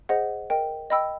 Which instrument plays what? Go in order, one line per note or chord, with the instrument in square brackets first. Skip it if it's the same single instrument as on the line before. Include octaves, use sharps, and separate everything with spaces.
[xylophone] G#4 C5 D#5 F#5
A#4 D#5 G5
D#5 G5 B5 E6